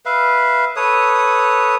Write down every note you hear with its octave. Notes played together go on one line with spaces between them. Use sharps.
B4 E5 F5
A4 B4 C#5 D#6